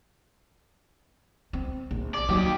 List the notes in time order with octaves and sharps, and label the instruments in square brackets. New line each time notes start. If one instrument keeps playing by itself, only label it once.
[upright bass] C4
A#1
[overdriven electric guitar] D5
[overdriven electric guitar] D#2 G4 [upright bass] F#3